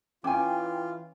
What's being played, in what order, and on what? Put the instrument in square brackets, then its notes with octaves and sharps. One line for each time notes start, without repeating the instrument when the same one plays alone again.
[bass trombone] E3 [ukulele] C#4 G#5 [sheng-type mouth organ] F4 [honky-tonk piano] G5 D6